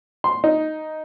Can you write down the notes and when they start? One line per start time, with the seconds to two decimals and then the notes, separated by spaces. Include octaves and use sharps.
0.24 C6
0.44 D#4